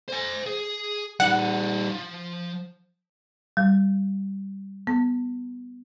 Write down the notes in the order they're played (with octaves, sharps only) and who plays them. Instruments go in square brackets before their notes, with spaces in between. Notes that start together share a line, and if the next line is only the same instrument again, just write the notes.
[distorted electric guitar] C5 G#5
G#4
[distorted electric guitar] G3 D#4 [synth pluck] F#5
[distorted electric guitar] F3
[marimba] G3
B3